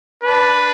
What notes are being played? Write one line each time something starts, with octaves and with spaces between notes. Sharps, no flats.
D4 B4